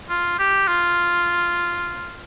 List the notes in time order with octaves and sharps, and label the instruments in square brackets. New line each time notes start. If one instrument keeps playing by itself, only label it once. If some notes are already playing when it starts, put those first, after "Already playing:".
[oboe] F4
G4
F4